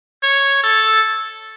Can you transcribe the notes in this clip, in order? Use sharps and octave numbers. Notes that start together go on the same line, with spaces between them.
C#5
A4